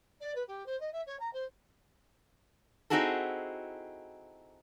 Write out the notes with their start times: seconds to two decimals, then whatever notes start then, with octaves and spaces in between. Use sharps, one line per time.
0.20 D5
0.35 B4
0.47 G4
0.66 C5
0.80 D#5
0.92 E5
1.06 C#5
1.19 A#5
1.33 C5
2.90 C4 D#4 E4 F#4 G#4 A4